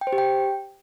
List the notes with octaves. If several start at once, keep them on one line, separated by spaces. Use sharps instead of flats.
G5
C5
G4
G5